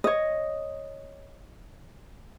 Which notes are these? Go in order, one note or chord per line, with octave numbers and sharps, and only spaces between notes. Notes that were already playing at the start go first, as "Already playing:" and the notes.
C#5 D#5